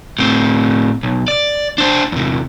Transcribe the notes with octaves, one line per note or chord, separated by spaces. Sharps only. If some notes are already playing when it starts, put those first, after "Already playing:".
A2 C4
B1
D5
D4 C5
E2 C3